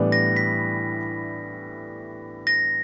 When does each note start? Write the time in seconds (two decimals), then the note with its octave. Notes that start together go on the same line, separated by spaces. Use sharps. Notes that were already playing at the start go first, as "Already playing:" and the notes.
Already playing: A2 E3 G3 B3 D4
0.12 A#6
0.37 B6
2.47 A#6